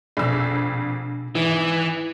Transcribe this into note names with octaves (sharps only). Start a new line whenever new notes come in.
A#1 F2 B2 D4 E6
G#1 E3 E4